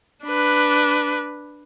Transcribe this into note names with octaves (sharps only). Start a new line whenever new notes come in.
D4 B4